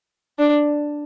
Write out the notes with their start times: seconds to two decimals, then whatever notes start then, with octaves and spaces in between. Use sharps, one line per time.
0.38 D4